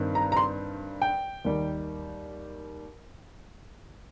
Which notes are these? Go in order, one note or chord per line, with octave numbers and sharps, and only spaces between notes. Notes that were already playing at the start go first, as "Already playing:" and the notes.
Already playing: G2 D#3 C4
A#5
A#5
C6
G5
D#2 D#3 G3